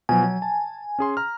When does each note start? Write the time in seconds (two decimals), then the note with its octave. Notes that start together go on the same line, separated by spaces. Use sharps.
0.09 B2 F3 F#3 G#5
0.23 F#3
0.42 A5
0.99 C#4 G#4 C6
1.17 A#5 F6